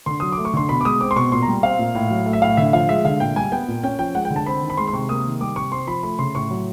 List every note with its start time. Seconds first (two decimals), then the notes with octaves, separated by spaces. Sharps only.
0.06 D3 C6
0.20 F#3 D#6
0.32 D6
0.38 A3
0.45 C#6
0.54 D3 C6
0.69 B2 B5
0.81 D6
0.85 G#3 D#6
1.01 C4 D6
1.11 C6
1.16 B2 C#6
1.32 A#2 C6
1.42 A#5
1.48 G3
1.63 C4 F5
1.79 A#2
1.95 A2
2.11 F#3
2.26 A3
2.33 E5
2.42 A2 F5
2.57 D3 E5
2.73 F3 F5
2.89 G#3 E5
3.05 D3 F5
3.20 A#2 G5
3.36 G3 G#5
3.52 B3 G5
3.68 A#2
3.83 C#4 G5
3.99 F3 G5
4.15 G#3 F#5
4.25 G5
4.30 D3
4.36 A5
4.46 C4 B5
4.62 D#3
4.70 B5
4.77 G#3 C6
4.88 C6
4.93 C3 C#6
5.09 A#3 D#6
5.25 D#3
5.40 G3 D6
5.56 C3 C#6
5.72 C4 C6
5.87 F3 B5
6.03 A3 B5
6.19 C#3 C6
6.35 A2 C#6
6.51 F#3